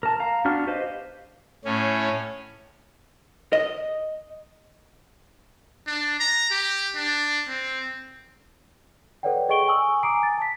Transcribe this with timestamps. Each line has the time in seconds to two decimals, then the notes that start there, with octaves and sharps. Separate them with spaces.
0.03 A#4 A5
0.20 F5 A#5
0.45 B3 D4 F#4 F6
0.67 G4 B4 C5 D#5 F5
1.65 A2 C#4
3.53 D#5
5.87 D4
6.20 A#5
6.51 G4
6.96 D4
7.48 C4
9.23 A4 B4 C#5 D5 F#5 G5
9.49 G#4 D#5 G5 C#6 D7 G7
9.68 G#5 C#6 D#6 E6 F#7
10.03 G#5 A#5 D6 D#6 C7 D7
10.23 A6
10.38 A5 B6